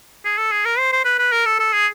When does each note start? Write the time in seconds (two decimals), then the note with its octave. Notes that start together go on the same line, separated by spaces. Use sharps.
0.25 G#4
0.38 A4
0.52 G#4
0.65 A#4
0.78 C5
0.92 C5
1.05 B4
1.19 B4
1.32 A#4
1.46 A4
1.59 A4
1.73 G#4